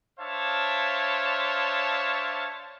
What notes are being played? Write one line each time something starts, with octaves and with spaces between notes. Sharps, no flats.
D4 C5 C#5 E5 F5 A5